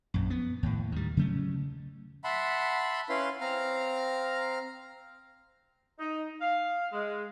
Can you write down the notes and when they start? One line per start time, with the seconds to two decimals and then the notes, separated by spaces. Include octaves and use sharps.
0.14 A#1 F#2
0.30 B3
0.63 D#2 A2
0.92 D#3 G3
1.17 C#3 F#3 A3 C#4
2.24 E5 F#5 A5 B5 C6
3.09 C#4 E4 B4 F5 C6
3.41 C4 F5 A#5 F6
5.99 D#4
6.41 F5
6.93 G#3